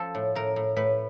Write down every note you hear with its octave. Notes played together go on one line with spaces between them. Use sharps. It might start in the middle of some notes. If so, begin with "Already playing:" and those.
Already playing: F3 A4
A2
A2 A#4
A2
A2 B4